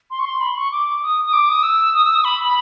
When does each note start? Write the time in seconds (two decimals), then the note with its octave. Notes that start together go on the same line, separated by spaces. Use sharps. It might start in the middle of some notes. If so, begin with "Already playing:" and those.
0.11 C6
0.19 C#6
0.25 C6
0.41 B5
0.50 C6
0.57 C#6
0.72 D6
1.03 D#6
1.25 D#6
1.33 D6
1.49 D#6
1.63 E6
1.95 D#6
2.05 E6
2.15 D#6
2.25 B5
2.44 B5